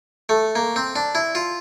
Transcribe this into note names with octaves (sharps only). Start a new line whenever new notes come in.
A3
A#3
C4
D4
E4
F4